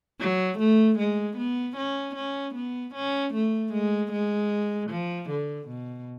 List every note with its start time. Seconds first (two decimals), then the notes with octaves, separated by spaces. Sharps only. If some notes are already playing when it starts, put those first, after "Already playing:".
0.20 F#3
0.59 A3
0.98 G#3
1.37 B3
1.77 C#4
2.16 C#4
2.55 B3
2.95 C#4
3.34 A3
3.73 G#3
4.12 G#3
4.90 F3
5.30 D3
5.69 B2